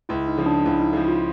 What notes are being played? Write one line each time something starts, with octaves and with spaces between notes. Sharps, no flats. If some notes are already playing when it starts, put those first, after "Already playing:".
C#2 E4
D#4
C#3 F3
D4
C#2 E4
D#4
C#3 F3 E4
F4